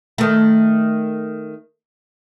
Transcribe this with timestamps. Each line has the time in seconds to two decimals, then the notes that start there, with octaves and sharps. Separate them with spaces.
0.18 D#3 A3